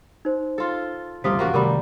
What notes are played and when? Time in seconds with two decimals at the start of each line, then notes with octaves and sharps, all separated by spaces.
0.25 D#4 C5
0.58 F4 A4
1.24 A1 D2 C3 G3 F4 A#4 D#6 B6
1.39 A1 A#3 F#4 A#4 F5
1.54 C3 D#3 G3 A3 A#3 G4 A#4 B5